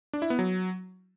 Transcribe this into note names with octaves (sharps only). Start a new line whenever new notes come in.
D4
E4
B3
F#3